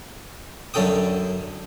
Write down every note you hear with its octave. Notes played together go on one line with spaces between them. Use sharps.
F#2 D3 C#4 A4 G5 D#6